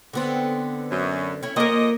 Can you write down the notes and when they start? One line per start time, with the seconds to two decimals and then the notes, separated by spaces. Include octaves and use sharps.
0.13 D3 B3 C4
0.91 F#2
1.43 C#4 E4
1.56 A#2 F3 A#3 A#4 D#5